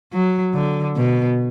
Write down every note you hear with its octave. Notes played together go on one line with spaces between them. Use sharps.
F#3
D3
B2